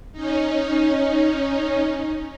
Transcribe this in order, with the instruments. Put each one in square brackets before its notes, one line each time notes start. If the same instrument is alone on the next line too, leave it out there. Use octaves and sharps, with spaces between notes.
[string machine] C#4 D#4